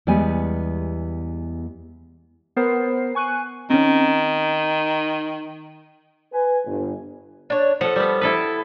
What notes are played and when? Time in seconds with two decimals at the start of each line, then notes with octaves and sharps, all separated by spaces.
0.07 E2 G3 G#3 B3 G4 G#5
2.56 B3 A#4 C5 C7
3.15 G#5 C#6 F#6 D#7
3.70 D#3 C4 C#4
6.32 B4 G#5
6.65 G1
7.50 D4 C#5
7.81 F3 A4 F#5
7.96 G3 B3
8.21 E4 A4 B4